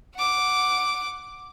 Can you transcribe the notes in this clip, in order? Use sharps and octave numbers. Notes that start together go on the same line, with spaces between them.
F#5 D6